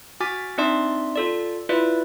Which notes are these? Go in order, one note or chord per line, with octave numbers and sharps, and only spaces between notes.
F#4 G#5 D6 F6 A6 B6
C4 D4 D#4 D5 E5 C6
F4 A4 D5
E4 F4 B4 D5 E5